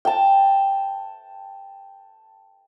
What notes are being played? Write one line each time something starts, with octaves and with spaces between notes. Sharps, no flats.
G5 A5